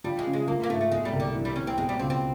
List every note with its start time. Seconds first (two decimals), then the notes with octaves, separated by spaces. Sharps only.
0.04 F3 G3
0.19 G#3
0.27 C#3
0.33 G#3
0.48 F3 A#3
0.64 A#3
0.70 G#2 A3
0.81 A3
0.91 B2 G#3
1.05 G3
1.13 C2
1.20 D3
1.35 E3
1.45 G3
1.56 C3 C#4
1.67 C4
1.78 B2 G#3
1.89 G3
1.99 C#2 C4
2.10 C4